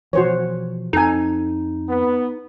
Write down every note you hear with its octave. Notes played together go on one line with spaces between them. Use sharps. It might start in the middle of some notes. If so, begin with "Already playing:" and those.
B2 E3 F3 F#4 C5 C#5
F2 C4 D#4 A4 G#5
B3